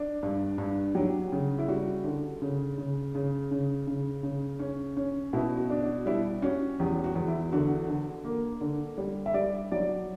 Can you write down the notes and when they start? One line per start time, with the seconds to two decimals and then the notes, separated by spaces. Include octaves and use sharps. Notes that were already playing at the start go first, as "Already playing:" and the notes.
Already playing: D4
0.23 G2
0.58 G2
0.95 F#3 G4
1.32 C#3
1.59 E4
1.68 G3 F#4
2.04 D3
2.42 C#3
2.78 C#3
3.15 C#3
3.51 C#3
3.87 C#3
4.23 C#3
4.60 C#4
4.97 C#4
5.33 B2 E4
5.57 F#4
5.70 D4
5.82 F#4
6.06 G3 E4
6.42 C#4 F#4
6.80 E2 G4
7.04 F#4
7.15 E2
7.28 E4
7.52 D3 F#4
7.88 D3
8.25 A#3
8.61 D3
8.98 G3
9.26 E5
9.34 G3 D5
9.72 F#3 D5